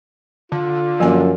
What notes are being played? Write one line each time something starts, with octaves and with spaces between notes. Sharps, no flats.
D3 F4
F#2 F3 A#3 G#5